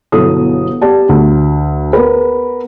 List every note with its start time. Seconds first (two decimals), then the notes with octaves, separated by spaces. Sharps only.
0.12 G1 B2 F#3 E4 A4 D#6
0.81 B3 G4 D5 A5
1.09 D2
1.93 B3 A#4 B4